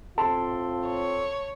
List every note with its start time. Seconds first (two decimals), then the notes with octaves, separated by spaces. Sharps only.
0.18 A2 C4 F4 A4 A5 C6
0.87 C#5